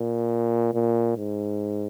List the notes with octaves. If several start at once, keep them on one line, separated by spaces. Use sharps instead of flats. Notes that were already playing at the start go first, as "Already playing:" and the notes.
Already playing: A#2
A#2
G#2